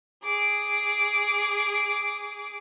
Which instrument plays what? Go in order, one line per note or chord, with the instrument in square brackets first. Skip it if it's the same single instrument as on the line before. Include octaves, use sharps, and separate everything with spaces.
[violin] G#4 D6